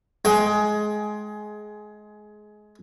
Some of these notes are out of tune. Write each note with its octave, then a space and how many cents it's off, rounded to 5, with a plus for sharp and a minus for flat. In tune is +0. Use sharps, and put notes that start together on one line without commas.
G#3 +20 G5 +0